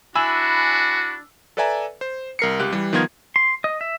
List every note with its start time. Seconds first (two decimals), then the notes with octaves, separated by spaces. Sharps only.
0.15 D4 E4 F#4 G#5 B5 E6
1.57 A4 B4 D5 E5 G#5 A#5
2.01 C5
2.39 C2 A#4 C7 C#7
2.59 C#2 G4 F#6
2.73 E3 G3
2.93 D#3 F3 B3 F4 A#4 G#6
3.36 C6
3.64 D#5
3.81 E5